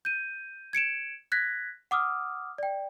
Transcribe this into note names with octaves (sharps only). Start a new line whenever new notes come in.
G6 D#7
G#6 C#7 D7 E7
F#6 G#6 A#6 B6
F#5 D6 D#6 F6
D5 G5